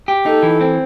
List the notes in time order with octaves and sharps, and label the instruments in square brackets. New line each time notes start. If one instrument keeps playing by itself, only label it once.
[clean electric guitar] G4
[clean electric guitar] D#4 [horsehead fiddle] A4
[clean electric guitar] E3
C4